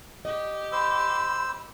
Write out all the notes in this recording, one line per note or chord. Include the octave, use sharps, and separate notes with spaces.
G4 D#5
C5 B5 E6